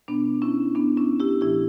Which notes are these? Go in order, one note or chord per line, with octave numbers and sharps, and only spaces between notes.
B2 B3 D4
C#4 E4
B3 D4
C#4 E4
E4 G4
A2 E3 E4 G4